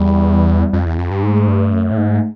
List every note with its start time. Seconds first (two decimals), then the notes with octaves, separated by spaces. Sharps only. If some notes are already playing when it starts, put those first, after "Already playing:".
Already playing: E2 G3
0.73 F2
0.86 E2
0.98 F2
1.11 G2
1.23 G#2 A3
1.48 G2
1.73 F#2
1.91 A2
1.98 G#2